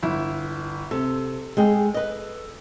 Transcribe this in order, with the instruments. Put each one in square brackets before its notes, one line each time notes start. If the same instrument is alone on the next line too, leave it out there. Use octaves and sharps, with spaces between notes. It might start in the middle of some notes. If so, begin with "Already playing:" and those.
[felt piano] G1 E4
[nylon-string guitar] C3 [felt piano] A4
[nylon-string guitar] G#3 G#4 G5
B4 D#5